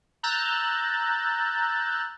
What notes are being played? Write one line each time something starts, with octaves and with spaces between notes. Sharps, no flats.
A#5 E6 F#6 G6 A6